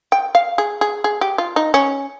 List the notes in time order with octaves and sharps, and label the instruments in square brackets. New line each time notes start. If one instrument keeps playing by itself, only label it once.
[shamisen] G5
F5
G#4
G#4
G#4
G4
F4
D#4
C#4